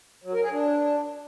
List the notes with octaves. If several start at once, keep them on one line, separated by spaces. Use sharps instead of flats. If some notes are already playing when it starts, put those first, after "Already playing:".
F#3
A#4
G#4
D4